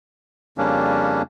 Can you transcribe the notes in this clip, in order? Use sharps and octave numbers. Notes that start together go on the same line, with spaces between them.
F2 C#3 G3 A#3 C#4 D4